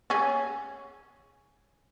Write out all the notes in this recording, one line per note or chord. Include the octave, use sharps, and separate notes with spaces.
C#4 G#4